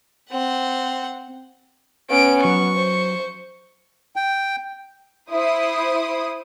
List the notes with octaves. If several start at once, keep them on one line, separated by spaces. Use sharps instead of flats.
C4 F#5
B3 C#4 D7
F#3 C#6
C5
G5
E4 C5 D#6